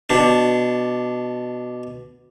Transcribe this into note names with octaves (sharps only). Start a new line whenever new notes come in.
B2 D4